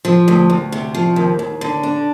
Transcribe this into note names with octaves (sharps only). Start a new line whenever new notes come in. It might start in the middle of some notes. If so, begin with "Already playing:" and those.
F3
D2
D2
C3
F3
D#2
D#2
D3
D4